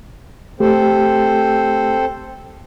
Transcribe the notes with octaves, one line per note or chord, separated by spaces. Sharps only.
A3 C4 G4 A4 C5